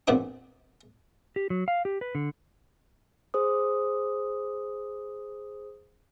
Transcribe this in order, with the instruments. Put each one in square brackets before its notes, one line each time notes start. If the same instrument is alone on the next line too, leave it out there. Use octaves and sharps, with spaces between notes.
[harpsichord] A#1 F2 A#2 B3 D4 D6
[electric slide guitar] G4
F#3
F5
G4
B4
D3
[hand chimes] G#4 C5 D#6